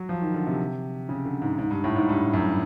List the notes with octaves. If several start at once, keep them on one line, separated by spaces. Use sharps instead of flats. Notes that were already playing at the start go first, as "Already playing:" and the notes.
Already playing: F#3
F3
D#3
D3
C3
C#3
D3
G#2
G#2
G2
A2
G#2
G2
F#2